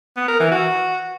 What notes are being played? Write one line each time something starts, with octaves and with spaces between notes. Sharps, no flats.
B3
A#4
E3
F#4